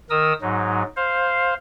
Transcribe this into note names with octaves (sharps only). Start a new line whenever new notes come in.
D#3 A#4 D#6 E6
G#2 F#3 D#4
C5 F5